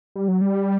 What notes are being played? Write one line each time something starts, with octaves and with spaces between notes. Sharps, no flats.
G3
F#3
G3